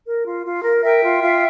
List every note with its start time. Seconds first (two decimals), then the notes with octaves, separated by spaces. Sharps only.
0.06 A#4
0.25 F4
0.45 F4
0.64 A#4
0.84 A#4 E5 G5
1.04 F4
1.23 F4